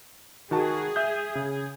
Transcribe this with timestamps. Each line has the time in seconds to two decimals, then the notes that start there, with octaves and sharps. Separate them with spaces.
0.51 D#3 F#4 G#4 A5
0.96 E5 D#6 G6
1.35 C#3